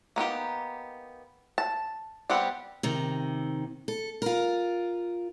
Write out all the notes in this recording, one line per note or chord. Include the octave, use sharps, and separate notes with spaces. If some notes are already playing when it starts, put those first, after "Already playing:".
A#3 B3 D#4 G4
A5
G3 B3 C4 G4 F#5
C3 D#3
A4
F4 A#4